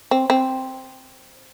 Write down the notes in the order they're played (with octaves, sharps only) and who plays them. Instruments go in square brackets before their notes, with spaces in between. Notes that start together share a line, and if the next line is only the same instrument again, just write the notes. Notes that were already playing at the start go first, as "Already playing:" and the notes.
[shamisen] C4
C4